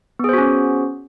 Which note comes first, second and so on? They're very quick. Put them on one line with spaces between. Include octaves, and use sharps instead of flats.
B3 G#4 C5 F#4 C#4